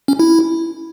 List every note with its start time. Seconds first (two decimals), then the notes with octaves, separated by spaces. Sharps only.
0.08 C#4
0.19 E4